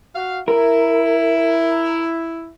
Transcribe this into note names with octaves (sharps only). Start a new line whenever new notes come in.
F#4 F5
E4 A#4